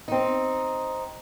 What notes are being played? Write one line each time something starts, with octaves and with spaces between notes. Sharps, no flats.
C4 D#4